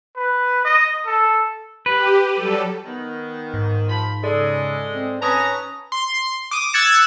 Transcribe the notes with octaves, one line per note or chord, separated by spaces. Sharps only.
B4
D#5
A4
G4 B4
F#3 G3 A4
D#3 B3
G#2
F3 B5
C#3 G#3 G#4 A4 D5
C4
C#4 B4 A5 A#5 D#6
C6
D6 D#6
E6 F#6 G#6 A6 C#7 E7